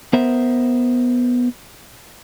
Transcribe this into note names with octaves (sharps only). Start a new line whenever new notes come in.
B3 A#4 C5 E5